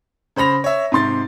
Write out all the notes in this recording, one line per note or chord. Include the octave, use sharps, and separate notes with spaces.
C#3 C5 B5 A#6 F7
C#5 E5
G#2 C3 C6 A6